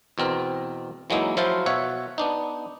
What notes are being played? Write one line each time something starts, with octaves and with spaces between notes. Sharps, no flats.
E2 B2 C4 A#4
E3 F#3 G#3 A#3 D#4 E4
F3 F#3 E4 F4 C5
B2 C#5 E5 F#5
B3 D4 D#4